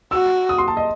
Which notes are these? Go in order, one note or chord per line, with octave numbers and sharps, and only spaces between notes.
F#4 E6
D#6
C6
A5
D#5